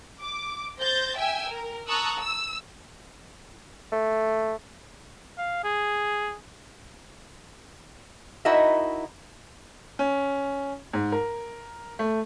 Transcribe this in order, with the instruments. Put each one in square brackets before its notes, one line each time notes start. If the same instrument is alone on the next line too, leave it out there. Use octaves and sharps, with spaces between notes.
[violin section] D6
C5 G6 A6 A#6
E5 G5 G#5 E6
A#4
A5 A#5 C#6 D#6 E6 F#6
E6
[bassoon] A3
[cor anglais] F5
G#4
[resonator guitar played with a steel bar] D#4 E4 F#4 A#4 D#5 E5
[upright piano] C#4
G#2
A#4
A3